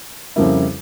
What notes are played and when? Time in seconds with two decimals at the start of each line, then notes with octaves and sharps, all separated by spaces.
0.36 F2 C#3 G3 A#3 E4